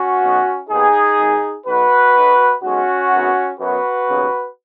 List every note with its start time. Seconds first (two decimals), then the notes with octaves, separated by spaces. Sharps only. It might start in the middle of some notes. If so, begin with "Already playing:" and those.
Already playing: C#4 F#4
0.20 B1 B2 B3
0.68 D#2 D#3 B3 D#4 G#4
1.17 G#1 G#2 G#3
1.66 B1 B2 F#3 F#4 B4
2.15 B1 B2 B3
2.63 B1 B2 G#3 C#4 F#4
3.11 G#1 F#2 F#3 B3
3.59 F#2 F#3 B3 F#4 B4
4.09 D#2 C#3 F#3 B3